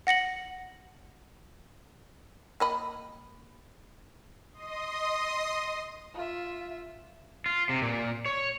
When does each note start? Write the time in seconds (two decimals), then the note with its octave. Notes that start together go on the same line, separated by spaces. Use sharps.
0.07 F#5 A#6 C#7 F#7
2.60 A#3 D#5 B5
4.53 D#5 C6 D#6
6.14 F4 E5
7.46 F4
7.69 C3
7.82 A#2
8.26 C#5